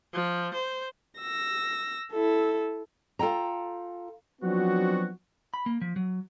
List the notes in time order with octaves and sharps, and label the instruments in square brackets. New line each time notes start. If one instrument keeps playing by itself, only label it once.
[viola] F3
C5
[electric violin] E6 A#6
E4 A4
[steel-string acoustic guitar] F4 A4 G5 A#5
[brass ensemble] F3 F#3 B3 C4 D4 F#4
[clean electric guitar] B5
A#3
F3
F#3